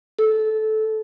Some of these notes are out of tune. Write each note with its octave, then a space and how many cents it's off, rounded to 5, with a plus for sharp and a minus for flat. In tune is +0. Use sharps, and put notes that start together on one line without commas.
A4 -15